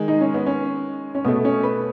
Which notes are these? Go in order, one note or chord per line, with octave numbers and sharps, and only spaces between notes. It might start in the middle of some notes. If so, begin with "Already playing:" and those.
Already playing: D#3 G#3
D#4
C#4
B3
C#4
C#4
B2 A3 B3
C#4
B4